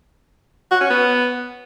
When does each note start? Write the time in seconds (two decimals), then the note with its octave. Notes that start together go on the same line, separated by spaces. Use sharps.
0.71 F#4
0.81 C#4
0.90 B3